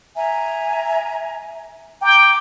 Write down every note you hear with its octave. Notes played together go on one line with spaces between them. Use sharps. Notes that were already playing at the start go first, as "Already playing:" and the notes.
E5 G#5 A#5
G5 A#5 D6